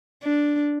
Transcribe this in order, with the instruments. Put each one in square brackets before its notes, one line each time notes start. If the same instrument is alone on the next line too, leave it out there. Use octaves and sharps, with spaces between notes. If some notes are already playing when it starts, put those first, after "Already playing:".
[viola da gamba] D4